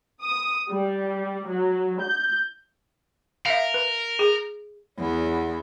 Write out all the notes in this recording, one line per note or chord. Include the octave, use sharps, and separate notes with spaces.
D#6
G3
F#3
G6
A#4 E5 F5
B4
G#4
E2 B3